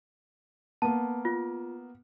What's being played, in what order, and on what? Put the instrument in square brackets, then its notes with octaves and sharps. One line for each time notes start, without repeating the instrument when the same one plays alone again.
[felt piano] A#3 B3 [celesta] A5
[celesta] F4